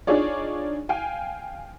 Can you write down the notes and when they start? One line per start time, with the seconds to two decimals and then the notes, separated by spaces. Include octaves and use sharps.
0.07 D4 D#4 F4 G#4 C#5 D5
0.89 F5 G5 G#5